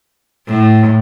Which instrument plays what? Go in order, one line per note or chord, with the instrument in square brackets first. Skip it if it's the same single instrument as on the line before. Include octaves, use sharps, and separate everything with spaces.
[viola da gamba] A2